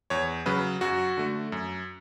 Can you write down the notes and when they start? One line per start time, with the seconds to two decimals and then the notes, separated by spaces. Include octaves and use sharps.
0.10 E2 C#5
0.46 C#3 F#3 B4
0.81 F#2 F#4
1.17 D3 A3
1.52 F#2